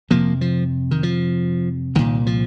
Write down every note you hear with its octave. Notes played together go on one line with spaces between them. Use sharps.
F2 C3 F3 A#3
F3
D#3
F3
C2 A#2 D#3
F3